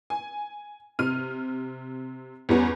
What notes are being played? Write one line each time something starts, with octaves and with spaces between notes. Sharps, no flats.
G#5
C3 F6 D#7
E2 G3 B3 C#4